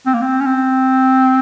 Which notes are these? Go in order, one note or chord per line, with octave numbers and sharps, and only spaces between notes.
C4
A#3
C4
C#4
C4